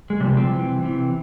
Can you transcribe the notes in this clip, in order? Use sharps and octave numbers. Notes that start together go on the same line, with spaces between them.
G#3
C3 F3 G3
C4
C3 E3
C3 E3